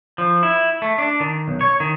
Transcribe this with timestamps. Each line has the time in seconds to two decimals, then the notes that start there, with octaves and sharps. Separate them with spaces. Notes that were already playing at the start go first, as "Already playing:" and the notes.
0.18 F3
0.43 E4
0.82 A3
0.98 D4
1.20 D#3
1.48 B1
1.61 C#5
1.80 D#3